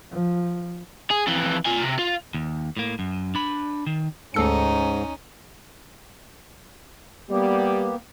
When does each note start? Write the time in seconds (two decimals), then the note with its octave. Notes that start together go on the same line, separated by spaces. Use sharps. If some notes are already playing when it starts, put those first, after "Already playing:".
0.11 F3
1.10 G#4
1.27 F2 E3
1.65 F4 G#5
1.82 C3
1.99 F4
2.34 D#2
2.77 A2 A#3
2.99 F#2
3.35 D4 B5
3.86 D#3
4.34 D2 G#2 C#4 D#4 A4 C#7
7.30 G3 A#3 B3 G4